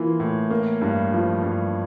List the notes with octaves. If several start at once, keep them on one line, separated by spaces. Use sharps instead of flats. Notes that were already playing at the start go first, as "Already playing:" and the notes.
Already playing: E3 A#3 F4
A2
A#3
G2
F3
G2